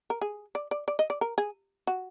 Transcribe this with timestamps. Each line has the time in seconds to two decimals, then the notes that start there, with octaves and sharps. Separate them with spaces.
0.10 A#4
0.21 G#4
0.55 D5
0.71 D5
0.88 D5
0.99 D#5
1.10 D5
1.21 A#4
1.38 G#4
1.87 F#4